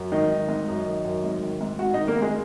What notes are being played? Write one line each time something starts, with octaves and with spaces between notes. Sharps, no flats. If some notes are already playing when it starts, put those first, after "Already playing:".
Already playing: F#2
G#2 D#3 D#4
D#3
G#2
F#2
D#3
F#2
G#2
D#3
G#2
G#2 F#4 F#5
D#3 D#4 D#5
A#3 A#4
G#2 G#3 G#4